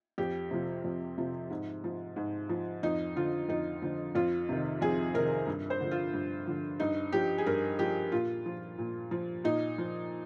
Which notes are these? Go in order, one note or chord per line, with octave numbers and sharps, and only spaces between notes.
F2 G4
C3 F3
F2
C3 F3
G#2
F3
G#2
F3
F2 D#4
D3 F3 F4
F2 D#4
D3 F3
F2 F4
C3 D#3
F2 G#4
C3 D#3 A#4
G2
C5
D3 F3
F4
G2
D3 F3
G2 D#4
F3 G4
G#4
G2 A#4
F3 G4
A#2 F4
F3
A#2
F3
A#2 D#4
F3